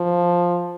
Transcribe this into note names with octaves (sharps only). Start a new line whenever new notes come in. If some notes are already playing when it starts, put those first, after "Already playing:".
Already playing: F3